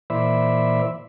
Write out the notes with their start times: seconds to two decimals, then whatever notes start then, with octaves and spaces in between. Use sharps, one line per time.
0.10 A#2 E3 C5 D5 E5 B5